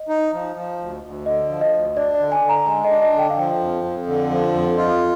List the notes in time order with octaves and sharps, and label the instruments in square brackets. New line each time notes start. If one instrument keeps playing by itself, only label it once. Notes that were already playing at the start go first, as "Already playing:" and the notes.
Already playing: [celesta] D#5
[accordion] D#4
F3
F3
D2
D2
[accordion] D3 [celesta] D#5
[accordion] F3
[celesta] D#5
[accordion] D2
[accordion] D4 [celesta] D5
[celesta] D5
[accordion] D3
[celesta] G#5
[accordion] D3
[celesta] A#5
[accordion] G#3 [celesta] G#5
[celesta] D#5
[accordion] D4
[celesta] D#5
[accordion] D3
[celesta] G5
F5
[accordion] F3 [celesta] G5
[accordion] F2
F2
D3
F3
F2
[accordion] F4 [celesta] D#5